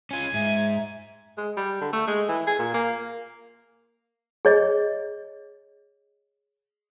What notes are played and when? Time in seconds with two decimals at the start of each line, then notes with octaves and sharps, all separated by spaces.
0.11 C#4 F4 G#5
0.34 G#2 E5
1.38 G#3
1.57 G3
1.81 D3
1.93 A3
2.08 G#3
2.29 E3
2.47 G#4
2.59 A#2
2.74 A#3
4.45 G#4 C#5 D#5